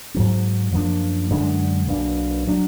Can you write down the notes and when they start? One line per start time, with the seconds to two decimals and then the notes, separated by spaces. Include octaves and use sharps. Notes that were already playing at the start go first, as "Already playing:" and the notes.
0.14 G#2 F#3 B3
0.72 F#2 F3 A#3 D4
1.30 F#2 D3 G#3 D4
1.88 B1 B2 A#3 D4
2.47 F#3 D4